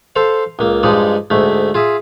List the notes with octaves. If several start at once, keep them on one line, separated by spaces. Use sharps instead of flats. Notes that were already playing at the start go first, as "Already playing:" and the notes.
A4 C5 F5
C#2 A#3
G2 F3 G#3 D#4 D5
D2 G#2 A3
F4 G#4 E5